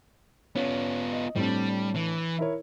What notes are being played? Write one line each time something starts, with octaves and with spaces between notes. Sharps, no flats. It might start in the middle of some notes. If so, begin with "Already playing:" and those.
B3 C#4 F4
D#5
A2 G3 C4 D4
E3
E4 A#4 C#5